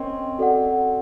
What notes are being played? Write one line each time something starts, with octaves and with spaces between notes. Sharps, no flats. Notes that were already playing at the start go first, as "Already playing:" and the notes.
Already playing: C4 C#4 A#4 D#5 G5 C6
F#4 A4 D5 F#5